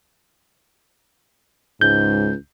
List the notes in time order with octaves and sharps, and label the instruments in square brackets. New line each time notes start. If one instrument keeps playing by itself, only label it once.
[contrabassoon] C#2 [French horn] G#2 [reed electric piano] G6